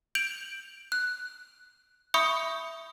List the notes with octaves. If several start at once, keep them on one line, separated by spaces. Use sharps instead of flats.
G6 D7 F7 F#7
F#6
E5 B5 C#6 D#6 G6 C#7